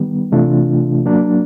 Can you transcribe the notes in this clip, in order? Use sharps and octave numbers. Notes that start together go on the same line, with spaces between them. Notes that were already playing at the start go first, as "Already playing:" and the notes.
Already playing: D#3 G3 B3
C3 E3 A3 D4 F4
F#3 A#3 D4